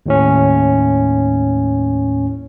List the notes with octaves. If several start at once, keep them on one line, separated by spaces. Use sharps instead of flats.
D#2 A2 C#4